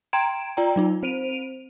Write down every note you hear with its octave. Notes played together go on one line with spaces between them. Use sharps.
G5 A#5 C6 G#6 D7 E7
F4 D5 G5 A#5
F#3 D#4 F4
C4 C5 D7 D#7 F7